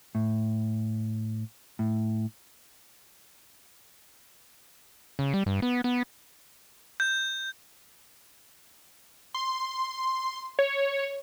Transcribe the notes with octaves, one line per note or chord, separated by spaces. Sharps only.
A2
A2
C#3
G3
G2
B3
B3
G6
C6
C#5